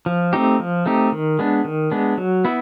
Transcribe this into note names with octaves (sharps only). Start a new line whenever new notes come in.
F3
A3 C4 D#4 G4
F3
A3 C4 D#4 G4
D#3
G#3 B3 D4
D#3
G#3 B3 D4
F#3
B3 E4